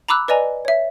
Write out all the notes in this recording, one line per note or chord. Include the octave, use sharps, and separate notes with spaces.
A#5 B5 D6 E6 F#6
B4 D5 D#5 G#5 A#5
C#5 E5